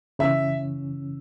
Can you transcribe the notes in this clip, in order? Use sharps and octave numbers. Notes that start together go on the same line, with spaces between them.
C#3 E3 C#4 E5